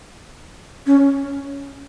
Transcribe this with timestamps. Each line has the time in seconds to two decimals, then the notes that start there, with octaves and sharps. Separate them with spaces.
0.86 C#4